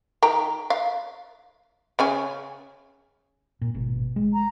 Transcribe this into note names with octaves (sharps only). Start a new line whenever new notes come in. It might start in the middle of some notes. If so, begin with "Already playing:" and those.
D#3 G5 A#5
F5
C#3 C#4 G#5
A#2
G#1 B2
G#3
A#5